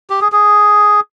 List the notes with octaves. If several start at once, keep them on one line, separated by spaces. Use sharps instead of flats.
G4
G#4
G#4